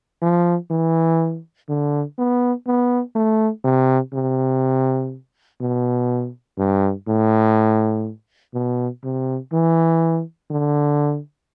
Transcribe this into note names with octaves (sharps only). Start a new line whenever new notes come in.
F3
E3
D3
B3
B3
A3
C3
C3
B2
G2
A2
B2
C3
E3
D3